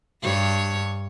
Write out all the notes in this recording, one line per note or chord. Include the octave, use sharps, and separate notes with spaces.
G2 C#5